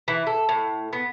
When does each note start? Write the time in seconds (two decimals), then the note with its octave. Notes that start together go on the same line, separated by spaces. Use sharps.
0.08 E3
0.27 A4
0.49 A2
0.93 B3